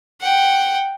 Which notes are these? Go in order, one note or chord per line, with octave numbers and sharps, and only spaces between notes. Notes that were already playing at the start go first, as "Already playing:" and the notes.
F#5 G5